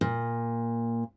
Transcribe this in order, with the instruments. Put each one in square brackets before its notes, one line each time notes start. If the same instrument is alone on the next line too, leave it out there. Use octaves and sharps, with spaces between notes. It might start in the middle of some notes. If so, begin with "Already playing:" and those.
[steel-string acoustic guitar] A#2